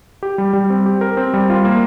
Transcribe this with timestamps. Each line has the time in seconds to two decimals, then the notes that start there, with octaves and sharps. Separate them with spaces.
0.23 G4
0.38 G3
0.53 G3
0.70 C4
0.86 G4
1.01 A#4
1.17 C4
1.34 G3
1.50 F4
1.65 A#3